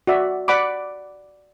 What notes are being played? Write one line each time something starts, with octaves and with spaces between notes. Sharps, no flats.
F#4 D5 E5
D5 F#5 B5 D6